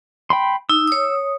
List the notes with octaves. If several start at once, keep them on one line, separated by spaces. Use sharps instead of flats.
G5 B5 C6
D#4 E6
C#5 D#6